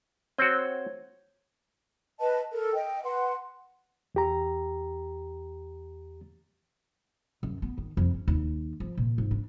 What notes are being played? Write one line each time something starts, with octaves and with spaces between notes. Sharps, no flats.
C4 F#4 C5 C#5
B4 D#5 A5
A4 A#4
D#5 G5
B4 F#5 C6
E2 G4 A#5
F#2
B3
D#3
F2
C#4
D#2
F3
A#2
G#2
D4